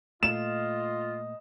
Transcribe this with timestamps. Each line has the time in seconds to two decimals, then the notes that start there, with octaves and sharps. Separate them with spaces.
0.23 A#2 A3 F4 D#5 E7